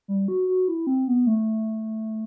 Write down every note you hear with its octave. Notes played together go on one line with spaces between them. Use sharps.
G3
F#4
F#4
E4
C4
B3
A3